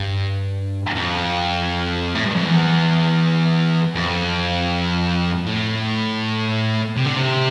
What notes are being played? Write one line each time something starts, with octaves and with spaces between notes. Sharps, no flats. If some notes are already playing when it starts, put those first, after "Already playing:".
Already playing: G2
F2
A2
G2
F2
E2
F2
A2
C3
D3
C3